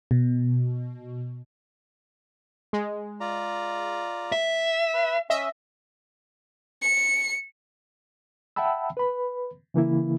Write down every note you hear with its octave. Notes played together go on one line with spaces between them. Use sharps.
B2
G#3
F4 D5 A#5
E5
B4 B5
C#4 D#5 E5
C#7
E5 F#5 G5 A5 B5 E6
B4 B5
C#3 E3 A#3 E4